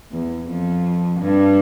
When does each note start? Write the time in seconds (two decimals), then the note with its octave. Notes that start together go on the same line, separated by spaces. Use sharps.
0.12 E2
0.48 F2
1.20 G2